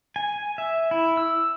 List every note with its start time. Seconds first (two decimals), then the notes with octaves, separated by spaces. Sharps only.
0.16 G#5
0.58 E5
0.91 E4
1.17 E6